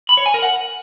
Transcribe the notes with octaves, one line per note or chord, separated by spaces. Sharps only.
B5
C#5
G#5
A#4
F#5